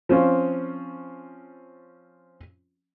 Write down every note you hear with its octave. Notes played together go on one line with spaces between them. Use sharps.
F3 C4 C#4 F4